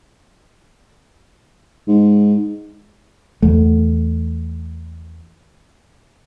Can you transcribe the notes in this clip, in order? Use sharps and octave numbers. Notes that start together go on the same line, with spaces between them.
G#2
E2 A3